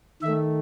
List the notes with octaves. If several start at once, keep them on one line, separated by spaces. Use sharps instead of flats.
D#3 A3 E5